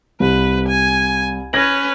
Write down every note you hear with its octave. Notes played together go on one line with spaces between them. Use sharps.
C2 B4
G#5
C#4 B4 G#6 A#6 F#7